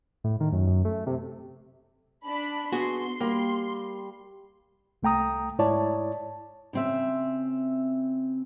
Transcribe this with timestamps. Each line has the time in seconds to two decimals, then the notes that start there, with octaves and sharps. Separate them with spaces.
0.24 A2
0.40 D#3
0.52 F#2
0.67 F#2
0.85 A3
1.07 C3
2.25 D4 B5
2.72 B3 F#4 G#4 C6
3.21 G3 A#3
5.03 C2 A3 G5 A#5 D#6
5.59 G#2 E4 C#5 D5 A5
6.73 C#3 C4 E5